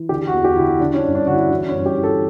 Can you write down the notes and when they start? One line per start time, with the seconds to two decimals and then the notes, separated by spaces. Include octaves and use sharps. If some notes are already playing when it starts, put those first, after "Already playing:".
Already playing: E3
0.09 D3 G4
0.27 F#4
0.33 E2
0.44 G4
0.56 D3 E4
0.62 F#4
0.80 D3 D4
0.93 C#4
0.98 D4
1.04 G2
1.15 D4
1.27 D3 F#4
1.33 E4
1.50 E3 C#4
1.68 C#4
1.74 G2
1.86 G4
1.98 E3
2.03 A4